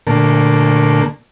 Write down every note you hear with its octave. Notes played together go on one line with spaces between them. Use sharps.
A#2 D3 A3 A#3